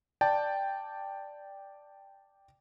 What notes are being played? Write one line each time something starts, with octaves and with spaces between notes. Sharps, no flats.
D5 G5 A5